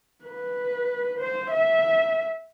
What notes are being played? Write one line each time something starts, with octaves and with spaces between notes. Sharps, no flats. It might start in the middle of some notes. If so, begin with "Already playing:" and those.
B4
C5
E5